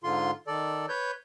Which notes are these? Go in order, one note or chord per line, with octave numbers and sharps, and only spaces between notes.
G#2 D3 F4 C6
D#3 A4 D5
B4 C#5 G6